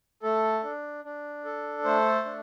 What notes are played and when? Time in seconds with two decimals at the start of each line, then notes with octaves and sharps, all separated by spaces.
0.23 A3 A4
0.63 D4
1.04 D4
1.45 A4
1.85 A3 C5
2.25 D4